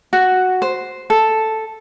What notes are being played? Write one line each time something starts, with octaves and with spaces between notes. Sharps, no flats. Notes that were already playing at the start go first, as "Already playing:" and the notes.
F#4
C5
A4